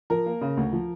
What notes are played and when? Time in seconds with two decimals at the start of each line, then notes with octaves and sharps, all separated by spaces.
0.10 F3 A#4
0.26 A#3
0.41 C#3
0.57 D2
0.73 F3